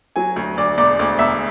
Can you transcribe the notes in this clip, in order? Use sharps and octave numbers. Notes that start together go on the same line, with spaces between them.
F#3 G#5
D2
D2 D5
E1 D5
D2 D5
E1 E5